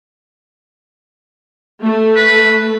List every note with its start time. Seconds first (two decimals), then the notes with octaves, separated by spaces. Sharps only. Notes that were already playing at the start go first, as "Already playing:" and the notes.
1.83 A3
2.16 B4